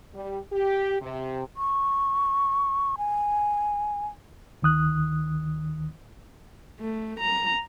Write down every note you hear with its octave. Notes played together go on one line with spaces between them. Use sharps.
G3
G4
C3
C#6
G#5
D2 D#3 D#6 F#6
A3
A#5